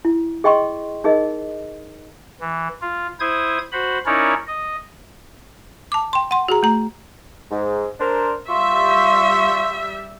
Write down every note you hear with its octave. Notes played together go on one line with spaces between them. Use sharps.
E4
G#4 D#5 G5 C6 C#6
D#4 G#4 A#4 D#5
E3
F4
E4 C5 D#6 G#6
F#4 C5 B5
C#4 D#4 E4 A#4 C#5 D5
D#5
A5 D6
G5 C6
F#5 C6
F#4 G#4 A#5
A3 A#5
G#2
D4 A#4 C5
G3 F4 E5 C6 C#6